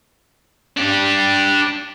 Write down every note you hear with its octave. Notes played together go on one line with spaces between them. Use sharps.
D4 G4